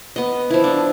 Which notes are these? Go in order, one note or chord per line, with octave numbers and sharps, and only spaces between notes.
B3 D#5
F3 E4
D4